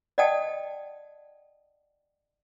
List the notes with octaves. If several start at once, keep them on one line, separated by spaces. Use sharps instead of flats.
D5 D#5 F#5 G5 A5 D#6